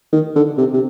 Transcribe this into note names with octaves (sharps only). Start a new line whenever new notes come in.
D#3
D3
C3
C3